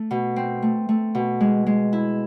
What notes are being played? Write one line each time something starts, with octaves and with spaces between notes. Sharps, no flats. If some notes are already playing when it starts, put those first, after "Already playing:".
Already playing: A3
B2
C4
A3
A3
B2
G#3
G#3
E4